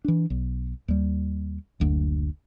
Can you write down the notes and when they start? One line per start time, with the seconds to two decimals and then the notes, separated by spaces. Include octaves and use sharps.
0.05 E3 D4
0.30 B1
0.88 D#2 G3
1.80 F#1 D2